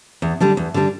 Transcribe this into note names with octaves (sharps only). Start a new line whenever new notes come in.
E2
D3 G3 D4
E2
D3 G3 D4